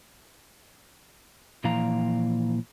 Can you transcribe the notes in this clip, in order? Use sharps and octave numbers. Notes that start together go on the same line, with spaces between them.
A#2 E3 F3 A#3 F5 A#5